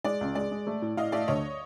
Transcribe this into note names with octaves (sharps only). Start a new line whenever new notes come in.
G#3 D5
C#2
G#3 D5
G#3
A3
A2
A2 D#5 F5
A3 D5 E5
D2 C#5 D#5